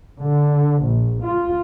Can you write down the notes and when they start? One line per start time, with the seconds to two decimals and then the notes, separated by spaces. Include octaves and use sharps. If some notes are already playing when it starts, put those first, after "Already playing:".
0.20 D3
0.85 A#1
1.23 F4